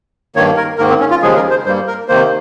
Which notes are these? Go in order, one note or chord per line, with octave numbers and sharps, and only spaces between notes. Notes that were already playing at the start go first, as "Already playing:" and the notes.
G2 D#3 A#3 C#5
A#4
G#2 D#3 A#3 A#4
C4
C#4
F4
D#2 C#3 F3 G#3 G#4
A#4
C5
G2 G3 A#3 C5
A#4
C3 D#3 A#3 C5